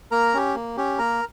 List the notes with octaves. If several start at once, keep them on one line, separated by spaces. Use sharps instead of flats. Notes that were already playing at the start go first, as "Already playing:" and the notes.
A#3 A#4 A#5
C#4 G4
A#3
C#4 G4
A#3 A#4 A#5